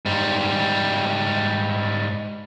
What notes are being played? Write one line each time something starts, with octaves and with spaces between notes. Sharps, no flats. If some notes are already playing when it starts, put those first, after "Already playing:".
G#2 G3